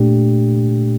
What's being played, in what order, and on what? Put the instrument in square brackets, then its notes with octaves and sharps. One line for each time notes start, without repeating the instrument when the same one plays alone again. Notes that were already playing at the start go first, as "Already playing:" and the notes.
Already playing: [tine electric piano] A#2 A3 D4 G4